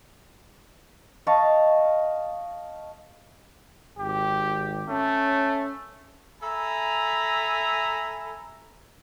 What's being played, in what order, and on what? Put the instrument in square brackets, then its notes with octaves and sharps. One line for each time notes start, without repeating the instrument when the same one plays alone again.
[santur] D#5 F5 A5 C#6
[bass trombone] G#1 [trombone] G4
[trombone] A3 [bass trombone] C#4
[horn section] A4 E5 G#5 A#5 B5